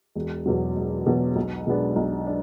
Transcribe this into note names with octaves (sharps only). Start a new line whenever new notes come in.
E1
E2 B2 F#3
E1
E2 B2 F#3
B1
B2 G#3 B3 D4
B1
D4